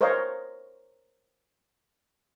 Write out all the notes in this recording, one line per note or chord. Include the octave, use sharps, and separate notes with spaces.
A#4 C5 C#5 D#5 F5